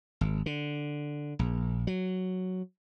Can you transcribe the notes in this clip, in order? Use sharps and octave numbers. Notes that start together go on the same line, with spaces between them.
G#1
D3
A#1
F#3